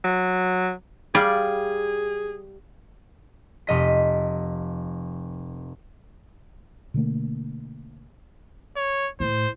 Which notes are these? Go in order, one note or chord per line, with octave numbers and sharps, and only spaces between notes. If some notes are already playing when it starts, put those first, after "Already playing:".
F#3
G3 G#4 D5 F5
F1 D#5 B6
B2 D3 A3 A#3
C#5
A2 C5